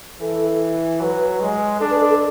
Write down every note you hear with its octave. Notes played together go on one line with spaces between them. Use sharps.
E3 A4
F#3 B4
G#3
D4 A4
B4
A4
A4